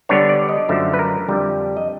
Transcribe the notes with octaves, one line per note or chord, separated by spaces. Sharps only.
D3 G3 B3 D4 C#5
D5
D#5
F#2 D3 F3 A3 E5
B4
A#4
F2 D3 G3
D#5